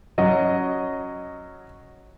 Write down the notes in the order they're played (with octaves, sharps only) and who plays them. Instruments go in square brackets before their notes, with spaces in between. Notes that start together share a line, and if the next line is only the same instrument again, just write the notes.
[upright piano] F#3 C#4 D#5